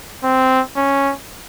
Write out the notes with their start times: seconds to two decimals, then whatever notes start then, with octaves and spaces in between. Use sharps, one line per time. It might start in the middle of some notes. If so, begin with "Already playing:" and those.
0.24 C4
0.77 C#4